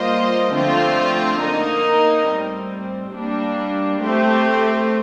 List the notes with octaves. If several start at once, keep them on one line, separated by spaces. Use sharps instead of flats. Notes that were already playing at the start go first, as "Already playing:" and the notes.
Already playing: G3 A#3 F4 C5 D#5
D3 F3 A3 C4 F4
A#3 D#4 A#4 D#5
A2 G3 C4
G3 A#3 D4
A3 C4 G4